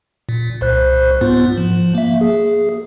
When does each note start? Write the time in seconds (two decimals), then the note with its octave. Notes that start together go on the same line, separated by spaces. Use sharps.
0.29 A#2
0.61 C2 C5 F#6
1.21 G#2 B3 F4
1.57 F3
1.95 A#3 E5
2.21 G#4